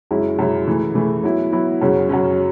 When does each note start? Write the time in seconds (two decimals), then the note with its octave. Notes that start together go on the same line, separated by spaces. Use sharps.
0.11 F#2 C#3 G#3 C#4 E4
0.39 F#2 C#3 G#3 C#4 E4
0.67 C#3 E3 A3
0.95 C#3 E3 A3
1.24 F#3 B3 E4
1.52 F#3 B3 E4
1.81 F#2 C#3 F#3 C#4
2.09 F#2 C#3 F#3 C#4